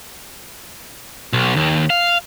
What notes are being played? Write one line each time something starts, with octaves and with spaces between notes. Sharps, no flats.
B1
D#2
F5